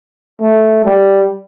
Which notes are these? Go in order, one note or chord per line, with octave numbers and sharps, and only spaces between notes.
A3
G3